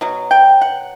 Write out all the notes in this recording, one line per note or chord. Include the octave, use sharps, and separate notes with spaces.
B2 F#3
G5
F#5